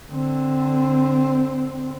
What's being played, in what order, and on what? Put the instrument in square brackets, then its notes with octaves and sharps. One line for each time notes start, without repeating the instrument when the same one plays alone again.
[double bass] D3 C4